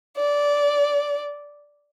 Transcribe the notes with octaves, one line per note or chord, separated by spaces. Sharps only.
D5